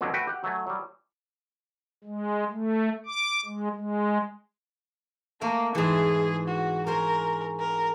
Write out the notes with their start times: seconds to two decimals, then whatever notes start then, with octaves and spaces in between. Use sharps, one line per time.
0.01 F2 B2 D3 F#3
0.14 A3 F#4 B4 F#5 G5
0.27 G4 F#5
0.44 F#3 A3 G#5
0.67 F#3 G3
2.04 G#3
2.50 A3
3.06 D6
3.46 G#3
3.75 G#3
5.41 A3 A#3 A#4
5.75 G#2 E3 G#4
6.48 F#4
6.87 C#4 A#4 C5
7.60 A#4